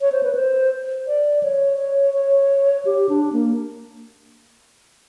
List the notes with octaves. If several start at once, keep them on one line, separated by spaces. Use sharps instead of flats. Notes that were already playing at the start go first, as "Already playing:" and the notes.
C#5
C5
B4
C5
D5
C#5
C#5
C#5
G4
D4
A#3